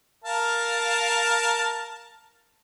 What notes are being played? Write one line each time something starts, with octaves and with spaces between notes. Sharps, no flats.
A#4 F5 A5